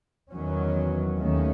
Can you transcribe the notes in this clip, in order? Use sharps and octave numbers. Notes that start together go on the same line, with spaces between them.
E2 D#3 F#3 C#4
D#2 D#3 A3 C#4